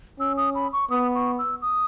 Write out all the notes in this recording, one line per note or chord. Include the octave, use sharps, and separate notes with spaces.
C#4 E6
D#6
B5
C#6
B3 D#6
C#6
E6
D#6